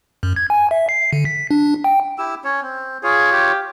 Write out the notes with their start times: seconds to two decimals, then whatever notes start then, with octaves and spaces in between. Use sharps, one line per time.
0.23 F#2
0.36 G#6
0.50 G#5
0.71 E5
0.89 C7
1.13 D3
1.25 B6
1.51 D4
1.84 G5
2.18 E4 G4 E6
2.44 C#4 C#5
2.62 C4
3.03 F4 G#4 C#5
3.32 G4